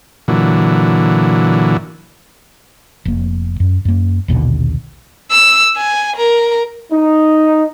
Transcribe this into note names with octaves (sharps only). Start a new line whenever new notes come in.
A#2 D3 E3 F#3
F1 A#3
F#2
F#2 A#3
A#1 D#2 B2 D3
E6
G#5
A#4
D#4